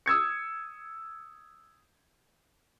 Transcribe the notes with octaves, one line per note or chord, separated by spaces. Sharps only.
D#6 E6 G#6 C#7